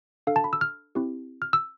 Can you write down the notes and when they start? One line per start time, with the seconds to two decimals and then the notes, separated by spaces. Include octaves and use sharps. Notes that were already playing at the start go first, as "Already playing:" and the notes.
0.27 D4 A4 F5
0.36 A5
0.44 B5
0.53 E6
0.61 F6
0.95 C4 E4 G4
1.42 F6
1.53 E6